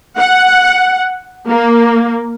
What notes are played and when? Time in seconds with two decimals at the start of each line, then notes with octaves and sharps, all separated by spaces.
0.17 F#5
1.49 A#3